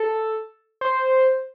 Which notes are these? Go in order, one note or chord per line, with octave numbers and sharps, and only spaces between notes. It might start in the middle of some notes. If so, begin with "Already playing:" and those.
Already playing: A4
C5